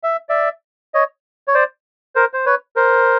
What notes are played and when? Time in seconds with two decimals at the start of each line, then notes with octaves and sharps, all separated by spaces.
0.03 E5
0.29 D5 E5
0.94 C#5 D#5
1.48 C#5
1.55 C5 D5
2.15 A#4 C5
2.33 C5
2.46 B4 C#5
2.76 A#4 C5